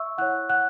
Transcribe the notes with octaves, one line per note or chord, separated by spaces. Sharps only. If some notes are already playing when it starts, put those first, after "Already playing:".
Already playing: E5 C#6 E6
E4 C#5 F#5 F#6
F#5 F#6